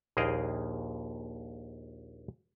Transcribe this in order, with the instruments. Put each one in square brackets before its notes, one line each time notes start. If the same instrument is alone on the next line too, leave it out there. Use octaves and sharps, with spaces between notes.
[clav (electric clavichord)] A#1 D#2 G#4 D#5 F5 G5